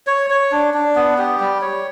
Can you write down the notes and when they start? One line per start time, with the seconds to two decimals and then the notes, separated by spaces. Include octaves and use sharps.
0.07 C#5
0.30 C#5
0.52 D4
0.74 D4
0.96 B3
1.18 G4
1.40 G3
1.62 C#5